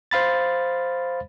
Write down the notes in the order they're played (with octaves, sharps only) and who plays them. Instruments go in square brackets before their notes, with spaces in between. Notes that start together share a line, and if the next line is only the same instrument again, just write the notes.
[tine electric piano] C5 F5 B5 A6